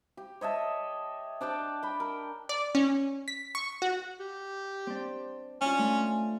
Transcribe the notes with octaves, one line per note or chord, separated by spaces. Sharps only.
G4
C#5 D#5 E5 A5
D4 D5 G5 A5
G5 B5
A#4
D5
C#4
B6
C#6
F#4
G4
C4 D4
C#4 D4 F4
A3